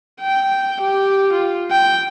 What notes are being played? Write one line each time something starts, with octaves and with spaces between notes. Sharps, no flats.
G5
G4
F4
G5